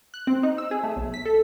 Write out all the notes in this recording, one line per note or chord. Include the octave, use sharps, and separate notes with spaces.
F#6
C4
D#4
E6
G#4
A3
B1
B6
A4